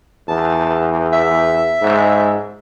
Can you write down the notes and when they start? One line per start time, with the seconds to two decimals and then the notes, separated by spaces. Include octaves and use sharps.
0.28 E2 A5
1.13 E5
1.82 G#2